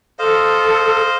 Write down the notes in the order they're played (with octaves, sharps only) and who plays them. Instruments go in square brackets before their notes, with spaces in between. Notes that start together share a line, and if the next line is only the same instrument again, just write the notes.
[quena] A4 [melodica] C5 D#5 F5